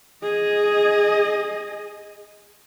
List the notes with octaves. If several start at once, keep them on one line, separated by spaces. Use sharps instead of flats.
G#4 D#5